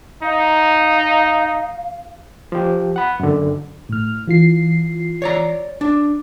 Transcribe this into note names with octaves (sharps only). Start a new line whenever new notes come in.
D#4 F5
F3 G4
F#5 B5
F#2 D3
A2 F6
E3 F4 C7
C#5 D5 A#5
D4